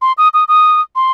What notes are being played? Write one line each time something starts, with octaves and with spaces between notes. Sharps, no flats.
C6
D#6
D#6
D#6
C6